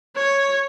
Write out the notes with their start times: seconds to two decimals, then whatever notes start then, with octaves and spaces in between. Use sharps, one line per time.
0.16 C#5